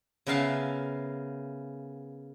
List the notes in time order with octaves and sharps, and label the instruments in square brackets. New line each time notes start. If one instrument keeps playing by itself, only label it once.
[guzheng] C#3 B3 A#4 E5 F5 A5